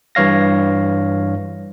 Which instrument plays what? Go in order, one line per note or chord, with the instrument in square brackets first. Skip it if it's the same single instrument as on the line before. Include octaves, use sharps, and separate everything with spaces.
[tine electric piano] G2 E3 C#5 F5 A#6